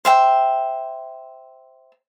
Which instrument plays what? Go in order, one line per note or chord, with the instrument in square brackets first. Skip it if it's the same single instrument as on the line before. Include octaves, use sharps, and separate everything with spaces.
[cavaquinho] C5 E5 G5